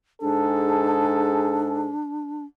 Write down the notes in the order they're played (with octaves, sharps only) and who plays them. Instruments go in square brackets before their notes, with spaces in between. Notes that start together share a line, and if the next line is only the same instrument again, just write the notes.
[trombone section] G#2 G#4 A4 [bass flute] D4